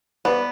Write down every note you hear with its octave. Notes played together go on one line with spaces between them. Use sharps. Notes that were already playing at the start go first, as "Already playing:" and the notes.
B3 B4 D5